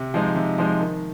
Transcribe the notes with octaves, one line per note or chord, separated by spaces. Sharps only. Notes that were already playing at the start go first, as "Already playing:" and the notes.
Already playing: C3
F3 G#3 D#4
C3
F3 G#3 D#4
D#3